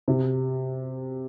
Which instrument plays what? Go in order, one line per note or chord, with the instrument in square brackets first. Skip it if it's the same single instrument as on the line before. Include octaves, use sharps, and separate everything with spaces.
[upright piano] C3